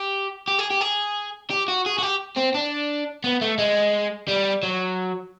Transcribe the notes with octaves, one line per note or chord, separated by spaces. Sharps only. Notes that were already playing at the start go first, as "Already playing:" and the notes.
Already playing: G4
G4
G#4
G4
G#4
G4
F#4
G#4
F#4
G4
C4
D4
B3
A3
G#3
G3
F#3